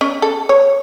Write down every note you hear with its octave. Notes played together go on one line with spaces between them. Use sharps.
C#4
A4
C#5